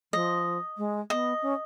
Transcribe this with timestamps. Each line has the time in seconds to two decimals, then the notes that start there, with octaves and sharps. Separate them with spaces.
0.13 F3 D#5
0.78 G#3
1.10 B3 D#5
1.42 C#4